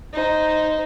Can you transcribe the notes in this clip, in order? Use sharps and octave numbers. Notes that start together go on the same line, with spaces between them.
D#4 C5